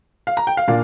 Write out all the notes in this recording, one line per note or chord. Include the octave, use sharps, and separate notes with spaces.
F5
A#5
G5
F5
A#2 A#3 D4 F5